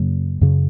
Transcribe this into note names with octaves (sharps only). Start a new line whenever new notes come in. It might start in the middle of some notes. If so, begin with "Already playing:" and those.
Already playing: F#2 C#3 F#3 A#3
F#2 C#3